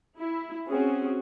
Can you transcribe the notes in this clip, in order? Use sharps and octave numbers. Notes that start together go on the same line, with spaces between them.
E4
C4 C#4 F#4 G#4